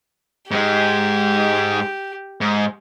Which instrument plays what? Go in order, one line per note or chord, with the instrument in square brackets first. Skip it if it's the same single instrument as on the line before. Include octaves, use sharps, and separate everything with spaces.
[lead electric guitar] G#2 G#3 [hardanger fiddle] G4
[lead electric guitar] G#2